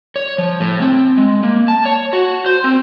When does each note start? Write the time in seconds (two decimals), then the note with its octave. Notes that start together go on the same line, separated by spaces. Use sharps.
0.16 C#5
0.38 F3
0.60 A2
0.82 C4
1.18 G#3
1.43 A#3
1.68 A5
1.85 C#5
2.13 F#4
2.46 C5
2.64 C4